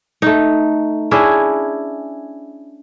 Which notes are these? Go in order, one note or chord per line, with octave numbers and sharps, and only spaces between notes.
A3 D#4
C#4 D4 E4 G#4